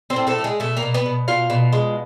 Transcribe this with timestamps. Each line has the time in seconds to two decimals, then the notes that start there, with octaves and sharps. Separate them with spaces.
0.10 C4 C5
0.16 A2
0.27 A3 A4
0.38 F3
0.44 G#3 G#4
0.60 B2 A3 A4
0.77 A#3 A#4
0.82 B2
0.94 B3 B4
1.06 B2
1.28 B2 F4 F5
1.50 B2
1.73 G#3